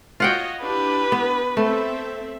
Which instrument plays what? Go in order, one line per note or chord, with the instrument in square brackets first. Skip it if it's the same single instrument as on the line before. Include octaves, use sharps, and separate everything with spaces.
[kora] F4 F#5 G5 [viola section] F#4 C#5 D#5
[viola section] D4 E4 G4 [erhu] B4
[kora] B3
[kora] A3 [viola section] C4 A4 E5